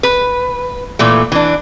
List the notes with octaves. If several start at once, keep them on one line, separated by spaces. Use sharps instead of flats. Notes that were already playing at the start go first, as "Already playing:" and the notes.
B4
A#2 E3 A3
E3 D4